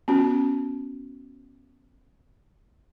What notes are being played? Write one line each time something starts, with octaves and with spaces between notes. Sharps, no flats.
B3 C#4 F#4